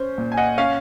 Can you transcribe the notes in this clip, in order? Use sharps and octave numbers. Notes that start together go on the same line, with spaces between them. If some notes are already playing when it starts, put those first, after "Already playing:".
Already playing: C#4 C5
A#2
G#5
D#5 F#5
C#4 C#5 F5